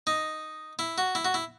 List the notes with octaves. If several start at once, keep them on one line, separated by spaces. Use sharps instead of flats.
D#4
E4
F#4
E4
F#4
E4